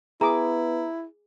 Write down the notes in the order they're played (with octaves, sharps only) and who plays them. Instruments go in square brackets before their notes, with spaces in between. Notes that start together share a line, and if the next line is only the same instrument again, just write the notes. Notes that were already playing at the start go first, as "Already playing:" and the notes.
[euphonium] B3 [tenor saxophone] E4 [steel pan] G#4 D6 [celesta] A#5